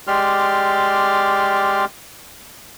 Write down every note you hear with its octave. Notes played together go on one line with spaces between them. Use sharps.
G#3 G4 D5 C6 F6